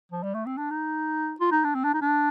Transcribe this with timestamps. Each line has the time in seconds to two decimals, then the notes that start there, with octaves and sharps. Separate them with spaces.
0.12 F3
0.23 G3
0.34 A3
0.46 C4
0.58 D4
0.71 D#4
1.40 F4
1.52 D#4
1.64 D4
1.75 C4
1.84 D4
1.94 D#4
2.01 D4